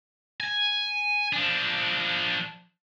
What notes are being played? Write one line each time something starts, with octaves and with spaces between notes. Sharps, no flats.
G#5
F3 D4